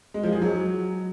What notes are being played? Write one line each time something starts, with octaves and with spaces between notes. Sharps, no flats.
G#3
F3
G#4
F#3